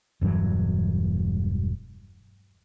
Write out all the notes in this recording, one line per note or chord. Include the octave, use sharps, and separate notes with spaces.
E1 G2 E3 F#3